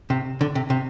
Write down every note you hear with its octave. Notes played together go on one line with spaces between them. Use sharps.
C3
D3
C3
C3